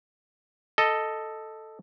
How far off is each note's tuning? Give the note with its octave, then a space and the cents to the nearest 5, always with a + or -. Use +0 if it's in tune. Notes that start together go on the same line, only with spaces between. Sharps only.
A4 +0 D#5 +0